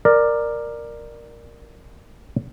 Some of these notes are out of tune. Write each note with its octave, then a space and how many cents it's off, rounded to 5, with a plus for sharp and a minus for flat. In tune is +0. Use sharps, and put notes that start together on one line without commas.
A#4 +0 D5 +15